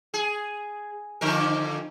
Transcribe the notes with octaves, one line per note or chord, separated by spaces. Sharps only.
G#4
F2 D3 A#4